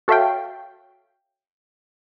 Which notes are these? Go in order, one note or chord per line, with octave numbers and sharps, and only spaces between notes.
F#4 A4 C#5 E5 F5 G5